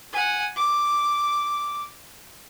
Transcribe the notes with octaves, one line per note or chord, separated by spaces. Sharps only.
F#5 G#5
D6